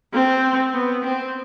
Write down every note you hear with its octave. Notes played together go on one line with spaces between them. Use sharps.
C4
B3
C4